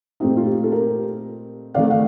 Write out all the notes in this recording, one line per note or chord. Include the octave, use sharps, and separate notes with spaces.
A#2 A3 C4 D#4 G4
F4
G4
A4
G4 A#4
C3 D#3 A3 D5 F5
F5